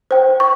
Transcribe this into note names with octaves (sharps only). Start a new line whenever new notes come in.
C5 G5
C#6